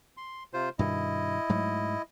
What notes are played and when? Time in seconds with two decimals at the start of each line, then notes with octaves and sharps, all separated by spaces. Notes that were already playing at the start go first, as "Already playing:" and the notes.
0.17 C6
0.54 C3 F4 C5
0.79 G2 B2 D#3 E4 D#5
1.49 G#2 F#3 A3